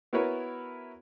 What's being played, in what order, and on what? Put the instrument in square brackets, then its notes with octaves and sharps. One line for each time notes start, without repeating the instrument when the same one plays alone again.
[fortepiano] B3 E4 F#4 A#4 B4 C#5